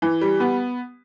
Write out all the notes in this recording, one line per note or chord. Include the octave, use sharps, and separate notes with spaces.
E3
G3
B3